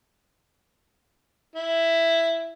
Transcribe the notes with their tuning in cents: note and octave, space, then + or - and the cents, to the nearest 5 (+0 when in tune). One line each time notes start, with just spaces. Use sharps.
E4 +5